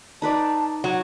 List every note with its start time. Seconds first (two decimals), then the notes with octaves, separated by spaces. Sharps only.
0.22 D#4 B4 D5 A5
0.84 F#3 F#5